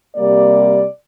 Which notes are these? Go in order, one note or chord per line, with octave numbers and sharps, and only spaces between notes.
C3 G3 A#3 D5